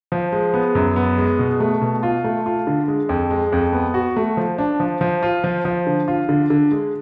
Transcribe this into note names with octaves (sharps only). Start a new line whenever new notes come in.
F3
G#3
B3
F#2
B3
G#3
B2
A3
B2
F4
A3
F4
D3
G#3
F2
G#3
F2
B3
F#4
A3
F3
D4
F3
F3
F4
F3
F3
D3
F4
D3
D3
G#3